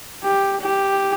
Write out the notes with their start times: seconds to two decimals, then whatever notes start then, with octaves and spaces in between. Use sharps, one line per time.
0.23 G4
0.60 G4